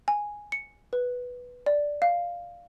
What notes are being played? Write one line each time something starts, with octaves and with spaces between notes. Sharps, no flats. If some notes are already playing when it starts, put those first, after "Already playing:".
G#5
C#7
B4
D5
F5